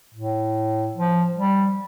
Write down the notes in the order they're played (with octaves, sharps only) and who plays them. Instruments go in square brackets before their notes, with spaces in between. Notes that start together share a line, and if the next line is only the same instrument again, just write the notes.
[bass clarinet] A2
F3
G3